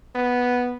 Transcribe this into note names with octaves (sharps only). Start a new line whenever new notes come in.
B3